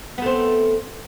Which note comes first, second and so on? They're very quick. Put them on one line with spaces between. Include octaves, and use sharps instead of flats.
B3 A3 C4